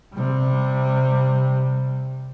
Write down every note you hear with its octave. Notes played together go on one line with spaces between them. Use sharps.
C3 G3